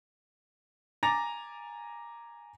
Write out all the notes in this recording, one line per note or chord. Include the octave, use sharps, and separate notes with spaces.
G#5 A#5 D6 A6 A#6 F7